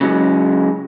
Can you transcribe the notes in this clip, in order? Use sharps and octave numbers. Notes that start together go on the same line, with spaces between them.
C#3 F#3 G#3